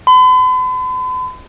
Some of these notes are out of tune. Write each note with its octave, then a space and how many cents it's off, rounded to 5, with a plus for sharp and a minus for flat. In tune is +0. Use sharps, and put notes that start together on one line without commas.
B5 +45